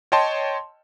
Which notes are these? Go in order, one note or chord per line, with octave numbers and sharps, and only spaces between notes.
C#5 D#5 G5 A5 C6